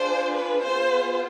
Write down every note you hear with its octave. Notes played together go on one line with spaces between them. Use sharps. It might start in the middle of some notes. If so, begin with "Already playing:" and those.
Already playing: D4 F4 G#4 C5
B4
B3 F4 G#4 C5